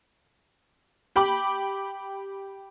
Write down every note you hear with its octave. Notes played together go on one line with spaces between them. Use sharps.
G4 G5 B5 D6